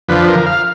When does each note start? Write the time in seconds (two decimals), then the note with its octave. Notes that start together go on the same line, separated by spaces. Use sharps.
0.08 F2 D3 F3 B4
0.28 A#4
0.46 F5